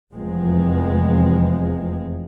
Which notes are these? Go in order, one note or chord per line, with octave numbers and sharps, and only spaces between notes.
F1 E2 C3 F3 G#3 C4